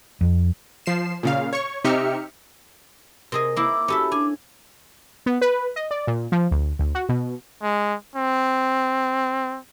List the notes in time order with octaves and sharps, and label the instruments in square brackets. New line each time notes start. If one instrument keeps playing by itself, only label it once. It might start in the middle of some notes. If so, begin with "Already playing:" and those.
[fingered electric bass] F2
[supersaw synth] F3 C7 E7
A#2 C#3 F5
C#5 C#6
C3 D#4 G4 E5 F6 C#7
[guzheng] C3 G#4 D#5 [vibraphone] A#4
[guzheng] A#3 E4 [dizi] D6 [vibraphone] E6
[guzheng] C#4 A4 E5 [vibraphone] F#4 G4 B5
[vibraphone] D4 [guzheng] G#5 [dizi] D6
[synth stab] B3
B4
D#5
D5
A#2
F3
D2
D2
F#4
B2
[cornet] G#3
C4